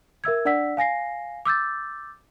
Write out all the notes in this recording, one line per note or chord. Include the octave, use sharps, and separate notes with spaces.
A#4 E5 E6 G#6
D4 D5 F#5 E6 B6
F5 G#5 A#6 C7
D6 E6 G6 A6